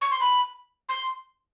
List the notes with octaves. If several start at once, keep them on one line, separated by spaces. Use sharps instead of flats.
C#6
C6
B5
C6